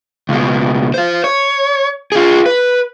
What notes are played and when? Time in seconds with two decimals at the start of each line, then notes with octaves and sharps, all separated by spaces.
0.29 C#2 B2
0.94 C5 F5
1.24 C#5
2.12 F4 G#4
2.46 B4